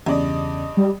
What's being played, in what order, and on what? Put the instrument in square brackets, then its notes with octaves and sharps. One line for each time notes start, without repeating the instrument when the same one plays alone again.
[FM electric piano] E2 C#3 [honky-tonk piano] G2 D5 D#5
[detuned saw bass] G3